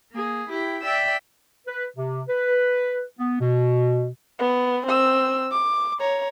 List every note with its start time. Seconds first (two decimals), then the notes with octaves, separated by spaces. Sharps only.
0.11 A#3 G#4
0.49 E4 G4 G5
0.83 D5 E5 G5 E6
1.67 B4
1.97 C3
2.28 B4
3.19 B3
3.40 B2
4.39 B3
4.87 C4 E6
5.51 D6
6.00 C#5 A#5